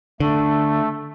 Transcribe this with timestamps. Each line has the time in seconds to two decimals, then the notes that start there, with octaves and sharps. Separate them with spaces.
0.20 D3 A3